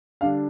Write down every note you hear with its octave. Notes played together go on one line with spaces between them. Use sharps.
D3 G3 D4 F5